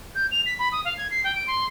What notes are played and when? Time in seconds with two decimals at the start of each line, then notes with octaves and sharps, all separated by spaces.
0.15 G6
0.31 F7
0.46 B6
0.59 B5
0.72 D#6
0.85 F5
0.98 G#6
1.11 C7
1.24 G5
1.36 D7
1.47 C6